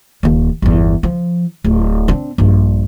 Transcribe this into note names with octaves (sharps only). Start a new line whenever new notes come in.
D#1 D#2
G1 E2
F3
D1
C4 D4
A#1 G2